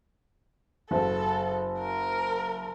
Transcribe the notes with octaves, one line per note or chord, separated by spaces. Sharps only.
F#1 A4
A#4